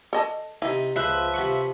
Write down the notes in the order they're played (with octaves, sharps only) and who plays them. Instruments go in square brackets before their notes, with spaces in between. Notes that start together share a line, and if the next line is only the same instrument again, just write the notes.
[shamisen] A4 D#5 A5
[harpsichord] C3 D#4 [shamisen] E4
[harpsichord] C#2 [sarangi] F3 [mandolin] B4 C5 E5
[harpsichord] C3 F#5 C#6